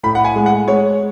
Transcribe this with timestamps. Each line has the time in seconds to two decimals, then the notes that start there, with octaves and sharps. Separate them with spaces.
0.03 A2 B5
0.15 F#5
0.25 G#5
0.36 G#3
0.46 F#5
0.67 G#3 C#5